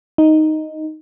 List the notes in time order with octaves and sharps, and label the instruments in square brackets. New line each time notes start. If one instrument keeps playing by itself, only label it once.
[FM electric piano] D#4